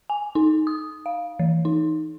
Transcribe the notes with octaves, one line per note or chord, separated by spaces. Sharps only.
G#5
D#4
D#6
F5
E3
D#4